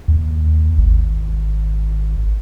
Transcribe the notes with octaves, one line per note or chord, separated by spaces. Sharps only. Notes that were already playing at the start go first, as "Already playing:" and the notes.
D#2
G#1